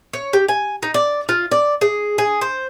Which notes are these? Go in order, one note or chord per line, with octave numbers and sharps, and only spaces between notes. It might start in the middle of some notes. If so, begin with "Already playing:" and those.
C#5
G4
G#5
D#4
D5
F4
D5
G#4
G#4
C5